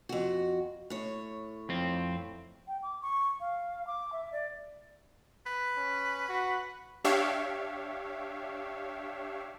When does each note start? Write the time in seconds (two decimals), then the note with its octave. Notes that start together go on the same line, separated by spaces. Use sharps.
0.09 F2 F#4
0.90 A2 C#5
1.69 F2 C4
2.68 G5
2.83 D6
3.02 C#6
3.40 F5
3.87 D6
4.13 E5
4.32 D5
5.46 B4
5.76 C#4
6.28 F#4
7.05 D4 G4 C#5 E5 F5